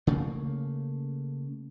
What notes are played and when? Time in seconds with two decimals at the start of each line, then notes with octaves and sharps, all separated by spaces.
0.07 C#3 A3 A#3